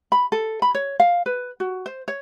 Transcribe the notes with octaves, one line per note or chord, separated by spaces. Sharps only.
B5
A4
B5
C#5
F5
B4
F#4
C5
C#5